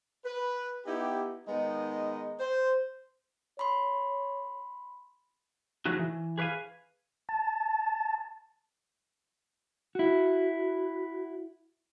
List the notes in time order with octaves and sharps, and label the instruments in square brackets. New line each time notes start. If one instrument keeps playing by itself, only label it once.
[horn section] B4
B3 D#4 E4 G4
D#3 G#3 B3 D#4 D#5
C5
[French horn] C#5 [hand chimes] B5 C6
[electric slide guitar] F3 F#3 G#3 A3 D#4 F#4
E3
G#4 B4 C#5 F5 G#5
[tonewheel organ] A5
[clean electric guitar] E4 F#4